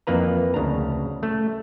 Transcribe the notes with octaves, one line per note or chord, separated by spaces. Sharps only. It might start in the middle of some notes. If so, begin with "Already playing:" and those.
F2 E3 A#3 B4 A#5
D2 C#3 D4 A#5
A3